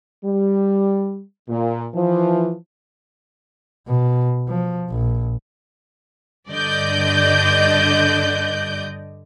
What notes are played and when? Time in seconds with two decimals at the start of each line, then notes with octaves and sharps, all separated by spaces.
0.25 G3
1.49 A#2
1.95 E3 F3
3.87 B2
4.48 F3
4.90 A#1
6.49 G2 D3 D5 D#5 G6